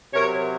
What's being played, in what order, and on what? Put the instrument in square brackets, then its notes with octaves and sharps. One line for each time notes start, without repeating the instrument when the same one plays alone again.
[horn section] C3 F#3 A#4 C#5